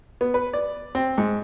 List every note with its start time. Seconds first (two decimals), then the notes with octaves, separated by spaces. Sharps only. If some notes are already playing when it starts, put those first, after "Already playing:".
0.21 B3
0.34 B4
0.53 D5
0.95 C4
1.18 G#2